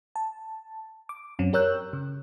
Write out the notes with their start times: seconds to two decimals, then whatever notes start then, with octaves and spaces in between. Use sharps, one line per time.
0.16 A5
1.09 D6
1.39 F#2 F#3 C4 C#4
1.53 G4 A#4 C#5 E6 F#6 G6
1.93 C#3